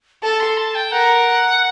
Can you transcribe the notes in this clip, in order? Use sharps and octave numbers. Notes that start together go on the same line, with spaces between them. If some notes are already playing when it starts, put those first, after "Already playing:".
A4 A5
C6
A5
G5
A#4 F#5